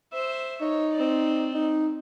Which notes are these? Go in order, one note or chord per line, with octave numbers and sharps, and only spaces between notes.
C5 E5
D#4 C#5
C4 D5
D#4